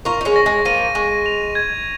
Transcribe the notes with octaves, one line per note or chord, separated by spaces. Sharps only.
F4 A#4 C#6
D#4
G#3 C#4
A#6
G#3
F3 A#3 D#7
G#3 C#6
F7
G#6